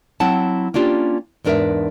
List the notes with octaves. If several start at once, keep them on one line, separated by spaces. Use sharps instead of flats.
F#3 C4 E4 F#5 A5
A#3 C#4 D4 F4 G4
E2 G#2 D4 A#4 B4 E5